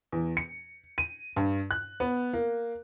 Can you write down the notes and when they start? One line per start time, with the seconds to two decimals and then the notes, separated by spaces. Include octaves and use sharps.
0.12 E2
0.37 C#7
0.98 D#7
1.36 G2
1.71 F#6
2.00 B3
2.33 A#3